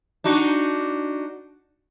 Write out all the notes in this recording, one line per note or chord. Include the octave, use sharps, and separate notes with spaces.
D4 D#4 F#4